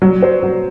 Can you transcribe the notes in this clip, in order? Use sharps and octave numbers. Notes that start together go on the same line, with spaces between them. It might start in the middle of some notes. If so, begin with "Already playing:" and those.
F#3
C5
F#3